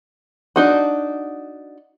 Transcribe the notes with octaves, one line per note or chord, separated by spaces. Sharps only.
D4 D#4 F#4